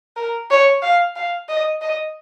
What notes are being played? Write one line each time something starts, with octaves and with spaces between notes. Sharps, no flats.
A#4
C#5
F5
F5
D#5
D#5